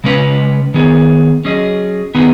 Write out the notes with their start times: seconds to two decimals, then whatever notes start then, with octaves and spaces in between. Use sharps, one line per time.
0.04 C#3 G#3 C#4 B4
0.74 D#3 B3 G#4
1.45 F#3 C#4 G#4 D#5
2.15 D#3 B3 D#4 G#4 B4